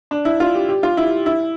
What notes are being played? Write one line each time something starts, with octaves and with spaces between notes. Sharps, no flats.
D4
E4
F4
G4
G4
F4
E4
E4